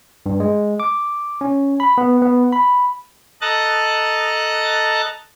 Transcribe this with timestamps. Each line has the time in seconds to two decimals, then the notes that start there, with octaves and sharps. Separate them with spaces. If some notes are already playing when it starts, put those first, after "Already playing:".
0.26 G2
0.40 G#3
0.80 D6
1.41 C#4
1.80 B5
1.98 B3
2.22 B3
2.52 B5
3.41 A4 D#5 A5 A#5 F#6 A6